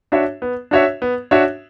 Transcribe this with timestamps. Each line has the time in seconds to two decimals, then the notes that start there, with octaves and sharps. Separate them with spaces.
0.12 D4 F#4 C#5 E5
0.42 B3
0.71 D4 F#4 C#5 E5
1.02 B3
1.31 D4 F#4 C#5 E5